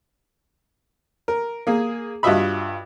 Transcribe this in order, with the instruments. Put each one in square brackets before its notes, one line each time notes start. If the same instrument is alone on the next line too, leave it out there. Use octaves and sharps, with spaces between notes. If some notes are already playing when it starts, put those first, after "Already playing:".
[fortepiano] A#4
A#3 G#4
G2 F4 F#4 D#5 E5 B5